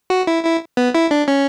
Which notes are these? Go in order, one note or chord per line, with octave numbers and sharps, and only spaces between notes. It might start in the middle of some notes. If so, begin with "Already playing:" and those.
F#4
E4
E4
B3
E4
D4
C#4